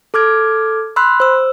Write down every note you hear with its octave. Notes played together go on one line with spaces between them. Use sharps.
A4 D6 F6 G#6
B5 C6 E6 F#6
C5 E6